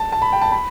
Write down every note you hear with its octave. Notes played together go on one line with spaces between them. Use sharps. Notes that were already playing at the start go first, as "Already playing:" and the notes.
Already playing: A5
A5
B5
G5
A5
B5